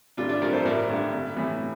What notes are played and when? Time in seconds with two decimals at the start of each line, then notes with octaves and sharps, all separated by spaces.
0.17 A1 D4 F4
0.29 D4 F4
0.42 G2 F3 A#4 D5
0.53 A4 C5
0.65 A1 A#4 D5
0.89 G2 D3
1.13 A1
1.37 A2 E3